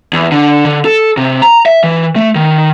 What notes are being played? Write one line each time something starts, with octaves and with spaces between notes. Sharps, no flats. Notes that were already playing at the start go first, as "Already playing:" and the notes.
E2
D3
D3
A4
C3
A#5
E5
E3
A3
D#3